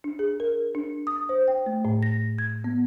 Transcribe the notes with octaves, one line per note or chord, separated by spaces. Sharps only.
D4
G#4
A#4
D4
D#6
C5
G5
A3
A2
A#6
G#6
B3